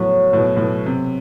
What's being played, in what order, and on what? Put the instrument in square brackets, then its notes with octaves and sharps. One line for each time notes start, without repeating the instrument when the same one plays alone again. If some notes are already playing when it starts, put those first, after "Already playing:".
Already playing: [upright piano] A2 [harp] F#3 B3 F#4
[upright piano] A2
B2
A2
B2
C3